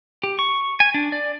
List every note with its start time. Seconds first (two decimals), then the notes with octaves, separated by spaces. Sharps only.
0.23 G4
0.39 C#6
0.80 G#5
0.94 D4
1.12 D5